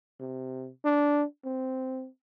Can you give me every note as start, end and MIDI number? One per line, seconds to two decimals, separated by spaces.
0.20 0.69 48
0.85 1.24 62
1.45 2.08 60